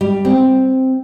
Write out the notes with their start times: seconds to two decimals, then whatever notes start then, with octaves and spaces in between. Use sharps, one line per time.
0.01 G3
0.25 C4